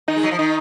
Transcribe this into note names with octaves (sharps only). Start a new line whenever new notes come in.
D#3 D#4
G#3
F#3
F3
D#3 D#4